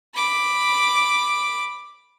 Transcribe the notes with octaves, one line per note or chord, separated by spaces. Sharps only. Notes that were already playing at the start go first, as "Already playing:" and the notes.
B5 D6